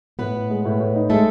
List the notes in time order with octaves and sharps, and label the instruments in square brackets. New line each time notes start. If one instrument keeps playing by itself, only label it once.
[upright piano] A2 [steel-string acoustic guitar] B3 B4
[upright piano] A2
G#3
A2
A2
D#4
[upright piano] G#3 [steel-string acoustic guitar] A3 A4